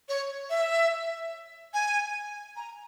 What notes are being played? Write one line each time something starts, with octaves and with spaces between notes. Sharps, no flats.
C#5
E5
G#5
A#5